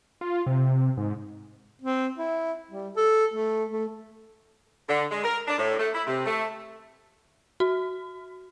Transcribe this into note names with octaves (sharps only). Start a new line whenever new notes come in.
F4
C3
G#2
C4
E4
G3
A4
A3
A3
D3
G#3
A#4
D4
A2
A3
E4
C3
A3
F#4